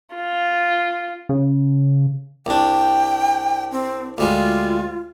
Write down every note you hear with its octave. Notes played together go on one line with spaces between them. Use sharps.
F4
C#3
C2 D4 G5
C4
D2 G3 G#3 F4